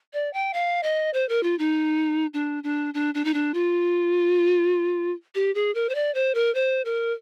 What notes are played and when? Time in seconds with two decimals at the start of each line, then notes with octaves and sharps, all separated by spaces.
0.13 D5
0.33 G5
0.53 F5
0.83 D#5
1.14 C5
1.29 A#4
1.43 F4
1.59 D#4
2.34 D4
2.64 D4
2.94 D4
3.14 D4
3.25 D#4
3.34 D4
3.54 F4
5.35 G4
5.55 G#4
5.75 A#4
5.89 C5
5.95 D5
6.14 C5
6.35 A#4
6.55 C5
6.85 A#4